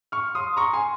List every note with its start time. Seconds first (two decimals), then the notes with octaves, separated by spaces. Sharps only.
0.12 C#6 F6
0.35 C6 D#6
0.57 A#5 C#6
0.73 G#5 C6